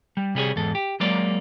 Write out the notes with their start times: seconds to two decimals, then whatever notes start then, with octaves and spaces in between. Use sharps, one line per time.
0.17 G3
0.35 C3 G3 G#4 C#5
0.56 E2 G#2 A4
0.75 G4
1.00 F#3 G#3 A#3 C#5 D5